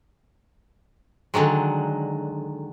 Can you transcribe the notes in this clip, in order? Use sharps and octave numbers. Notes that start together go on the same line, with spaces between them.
D3 D#3 F#3 G#3